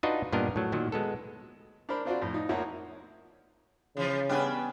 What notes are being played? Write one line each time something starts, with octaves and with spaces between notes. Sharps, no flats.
D4 D#4 F4 F#4 B4 D#5
G2 A#2 B3 D4 A#4 D#5
A2 F#3
A#2 D#3 F#3
G#3 B3 A4
D4 A#4 C5 B5
C4 D4 F4 F#4 C5 D5
F2 A2
D#4
F2 F3 A#3 C#5 E5 F#5
C#3 E3 F3
G3 B3 C#4 D4 B4